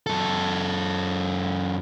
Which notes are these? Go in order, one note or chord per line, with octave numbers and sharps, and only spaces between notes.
F#2 A4